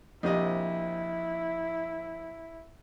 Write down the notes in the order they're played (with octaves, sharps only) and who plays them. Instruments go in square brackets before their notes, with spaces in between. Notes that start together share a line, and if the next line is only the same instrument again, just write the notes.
[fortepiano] A#1 C3 D#5 [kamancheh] E4